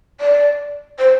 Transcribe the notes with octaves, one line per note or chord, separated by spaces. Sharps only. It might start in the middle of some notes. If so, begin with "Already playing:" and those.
D5
C5